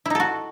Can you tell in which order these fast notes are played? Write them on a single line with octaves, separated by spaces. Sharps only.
E4 D#4 A4 F#4